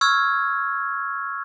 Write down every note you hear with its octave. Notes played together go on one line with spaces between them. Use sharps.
C#6 E6 F6 G#6